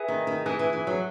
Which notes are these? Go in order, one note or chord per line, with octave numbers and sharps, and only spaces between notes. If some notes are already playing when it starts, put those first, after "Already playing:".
Already playing: G#4 B4 E5 G#5
D#3
D#3
E3 G#4 B4 E5 G#5
E3
E3
F#3